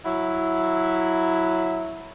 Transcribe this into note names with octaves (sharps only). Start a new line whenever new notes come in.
F#3 E4